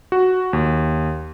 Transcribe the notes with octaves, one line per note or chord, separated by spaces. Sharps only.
F#4
D#2